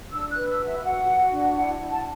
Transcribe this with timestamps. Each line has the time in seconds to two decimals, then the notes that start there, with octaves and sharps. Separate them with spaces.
0.12 D4 E6
0.31 F#6
0.37 B4
0.49 E6
0.61 F#4
0.66 E5
0.80 E5
0.84 F#4 F#5
1.07 F#4
1.32 D4
1.55 E4 F#5
1.79 E4
1.91 A5